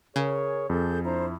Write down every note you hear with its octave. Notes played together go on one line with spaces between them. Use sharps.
C#3 G#4 A#4 C#5
F2 G#4 A4 G6
D4 E4 C5 A#5